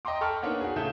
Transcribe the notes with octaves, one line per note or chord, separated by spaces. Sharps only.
D#5 G5 A#5 C6 D6
A4 G5 A5 B5 C#6 F6
A#3 B3 D4 D#4 C#5 F#5
F#4 G#4
A2 C#3 E4 A4 G6 E7